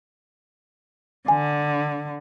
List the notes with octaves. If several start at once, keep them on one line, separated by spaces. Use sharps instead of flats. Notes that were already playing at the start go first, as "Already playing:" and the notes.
D3 G#5